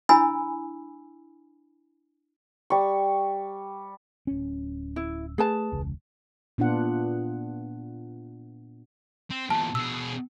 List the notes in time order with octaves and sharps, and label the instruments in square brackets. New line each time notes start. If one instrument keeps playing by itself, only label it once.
[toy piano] D4 E4 G#5 B5 E6
[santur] G3 C#6
[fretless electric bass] D1 C#4
[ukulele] E4
[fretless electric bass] A3 [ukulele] G#4 B4 A5
[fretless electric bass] E1 C#2
[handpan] A#2 B3 D4 F4 F#5
[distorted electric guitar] C4
[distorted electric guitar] E2 A#2 [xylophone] A5
[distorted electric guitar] B2 G#4 [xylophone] E6